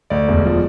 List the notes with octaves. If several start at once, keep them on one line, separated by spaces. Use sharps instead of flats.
D2 D5
E1
F3